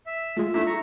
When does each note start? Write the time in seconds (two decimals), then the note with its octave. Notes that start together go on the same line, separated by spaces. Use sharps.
0.06 E5
0.37 G#3 A3 F4
0.54 A3 A#3 D4 E4 E5
0.67 A#5 C#6